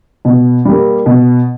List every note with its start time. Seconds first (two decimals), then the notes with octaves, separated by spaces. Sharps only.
0.25 B2
0.65 G3 A#3
1.06 B2